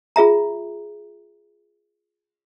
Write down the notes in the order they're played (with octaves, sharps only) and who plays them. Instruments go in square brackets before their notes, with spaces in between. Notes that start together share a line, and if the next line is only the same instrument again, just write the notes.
[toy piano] F4 G#4 E5 A#5